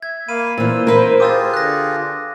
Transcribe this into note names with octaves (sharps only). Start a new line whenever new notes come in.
E5 G#6
A#3 F5 B5 D#7
A#2 E3 C5 E6
E4 A#4 B4
F4 G4 G#4 D6 E6 A6
D3 F#6 A#6